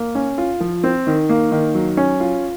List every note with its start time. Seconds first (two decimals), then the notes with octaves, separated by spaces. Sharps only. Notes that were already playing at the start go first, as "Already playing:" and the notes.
Already playing: A#3
0.15 C#4
0.38 F4
0.60 F3
0.84 C4
1.07 D#3
1.29 A#3
1.52 D#3
1.75 F#3
1.97 C#4
2.20 F4